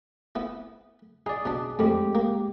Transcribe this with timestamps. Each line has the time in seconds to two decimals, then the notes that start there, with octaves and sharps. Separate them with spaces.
0.35 B3 E4
1.26 D#4 G#4 D5
1.45 B2 D4
1.79 F2 A2 G#3 G4
2.15 A#3